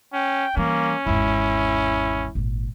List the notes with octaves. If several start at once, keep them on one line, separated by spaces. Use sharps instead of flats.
C#4 G5
E3 G3 A#3 C#4
G#1 E2 E4
G#1 A#2